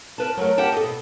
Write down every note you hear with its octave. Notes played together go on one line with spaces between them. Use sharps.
A#4 B4 A5
F#3 A3 A#4
G4 A#4 F#5 G5 A5
A4 D#5
B2